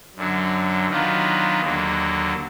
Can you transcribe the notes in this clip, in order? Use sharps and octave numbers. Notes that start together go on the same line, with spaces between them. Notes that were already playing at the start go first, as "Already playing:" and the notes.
F#2 D3 F#3
D#3 F#3 B3 D4 F4
D#2 D3 F#3 A#3